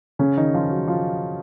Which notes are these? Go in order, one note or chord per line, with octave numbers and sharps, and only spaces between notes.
C#3 C#4
D#3 D#4
F3 F4
F#3 F#4
F3 F4